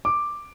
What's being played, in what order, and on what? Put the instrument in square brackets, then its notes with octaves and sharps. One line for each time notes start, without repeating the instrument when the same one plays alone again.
[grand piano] D6